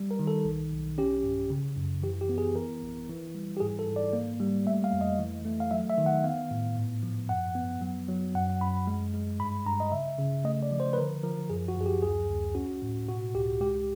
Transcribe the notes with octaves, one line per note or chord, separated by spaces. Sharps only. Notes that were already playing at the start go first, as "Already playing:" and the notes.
Already playing: G3
A#4
D#3
A4
B1
B1
C#4 G4
G2
C#3
F#2
E3 G4
G4
B3
G#4
E3 A#4
A1
E3
G3
G4
G#2 G#4
A4
G#2
D5
A#3
G3
A3 E5
F5
F2
D#5
E3
A3
F5
F#3 E5
E5
D#3
F#5
B3 F5
A2
G#2
F3
F#2 F#5
B3
F#3
F#3
F#2 F#5
F#2 B5
G#3
G#3
G2 B5
G2 A#5
D#5
C#3 E5
C#3
A3 D#5
D5
F3
C5
B4
D3 A#4
F3 A#4
F#2 G#4
F#4
F#2 G#4
G4
D2 G#4
D2
C#4 F#4
A2
B2 F#4
C#2 G4
G#3 G4